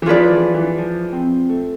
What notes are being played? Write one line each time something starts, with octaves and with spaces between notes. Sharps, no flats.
E3
F3 F4 G#4 B4 D5
E3
E3
F3
C4
A3